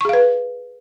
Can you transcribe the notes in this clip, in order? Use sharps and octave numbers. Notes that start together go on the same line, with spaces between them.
G#4 B4 F5 C#6